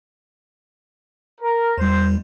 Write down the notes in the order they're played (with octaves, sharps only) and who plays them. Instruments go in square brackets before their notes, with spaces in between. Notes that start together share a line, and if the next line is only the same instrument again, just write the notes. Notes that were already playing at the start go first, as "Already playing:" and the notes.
[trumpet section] A#4
[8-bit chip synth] E2 G3 [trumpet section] C5